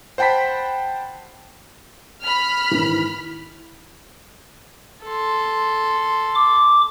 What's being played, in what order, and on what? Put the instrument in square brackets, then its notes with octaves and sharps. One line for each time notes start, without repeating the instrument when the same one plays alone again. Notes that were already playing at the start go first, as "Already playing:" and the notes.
[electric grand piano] C5 F#5 G5 A5 B5 B6
[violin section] B5 F6
[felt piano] G#2 D#3 E3
[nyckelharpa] A4 C6
[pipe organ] D6